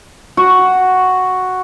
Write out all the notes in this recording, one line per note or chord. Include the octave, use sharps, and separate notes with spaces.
F#4